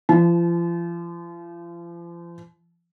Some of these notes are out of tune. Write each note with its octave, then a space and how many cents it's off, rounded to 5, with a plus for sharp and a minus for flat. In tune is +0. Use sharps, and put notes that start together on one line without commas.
F3 -35 A5 -30